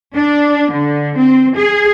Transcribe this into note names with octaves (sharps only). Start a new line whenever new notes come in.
D4
D3
C4
G#4